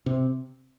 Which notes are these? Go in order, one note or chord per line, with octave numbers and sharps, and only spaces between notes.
C3